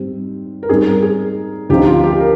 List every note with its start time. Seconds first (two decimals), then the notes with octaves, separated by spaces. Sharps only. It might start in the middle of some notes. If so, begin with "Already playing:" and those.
Already playing: G#2 G3 C4 G4
0.63 A#4
0.69 G#2 G3 C4 G#4
0.86 A#4
1.03 G#4
1.69 D2 D3 F3 C4 D#4 G4
1.87 F4
2.03 G4
2.20 A#4